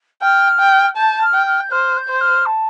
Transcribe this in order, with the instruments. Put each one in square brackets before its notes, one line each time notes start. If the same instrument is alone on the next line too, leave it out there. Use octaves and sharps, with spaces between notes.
[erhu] G5 [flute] F6
[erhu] G5
[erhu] A5 [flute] G6
[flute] F6
[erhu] G5
[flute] F6
G6
[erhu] C5 [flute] F6
[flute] G6
[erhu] C5
[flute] F6
A5